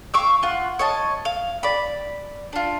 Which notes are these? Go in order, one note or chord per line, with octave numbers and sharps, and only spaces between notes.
F5 C#6 D6 E6
F4 F#5
C#5 D#5 A5
F5
D5 B5
D4 F4